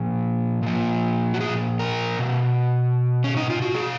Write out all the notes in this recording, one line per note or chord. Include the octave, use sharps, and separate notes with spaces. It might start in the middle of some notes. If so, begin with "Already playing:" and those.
Already playing: A#2 F3
A#2 F3
F#4
G#4
A#4
B2
C#4
D#4
F4
F#4
B2 G#4